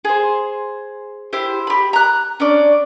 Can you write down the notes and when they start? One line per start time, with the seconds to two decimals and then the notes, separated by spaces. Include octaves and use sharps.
0.05 G#4 C5
1.33 E4 G4 C5
1.67 G4 B5
1.93 A#5 F#6
2.40 C#4 D4 D5